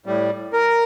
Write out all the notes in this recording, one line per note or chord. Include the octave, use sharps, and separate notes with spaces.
A2 G3
A#4